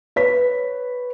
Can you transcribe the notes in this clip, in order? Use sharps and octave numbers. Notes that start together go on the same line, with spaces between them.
B4 C#5 B6